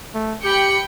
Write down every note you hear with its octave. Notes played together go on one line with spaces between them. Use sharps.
A3
G4 G5 B5 C#7